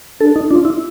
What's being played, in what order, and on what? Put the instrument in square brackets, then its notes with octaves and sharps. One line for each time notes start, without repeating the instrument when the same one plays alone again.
[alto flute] D4 [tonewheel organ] A4
[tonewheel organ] D#4
[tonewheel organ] D4 [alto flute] F4
[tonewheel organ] E4